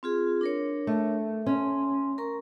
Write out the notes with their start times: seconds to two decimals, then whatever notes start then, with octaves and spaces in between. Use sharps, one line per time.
0.03 C4 F4 G#4
0.41 D4 A#4 C#5
0.87 A3
1.47 C#4 C6
2.18 A#4 A#5 C#6